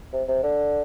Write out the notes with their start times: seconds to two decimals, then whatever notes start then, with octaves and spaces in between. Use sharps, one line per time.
0.13 C3
0.28 C3
0.43 D3